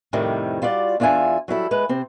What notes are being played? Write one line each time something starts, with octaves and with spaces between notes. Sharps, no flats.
F2 A2 C3 D#3 G3
G3 F4 F#4 D5
E2 D4 F4 E5 G#5
F#3 G3 E4 A4
G#3 B4
C3 C4